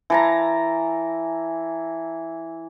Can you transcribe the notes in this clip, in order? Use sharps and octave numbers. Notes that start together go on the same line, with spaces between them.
E3 A5 A#5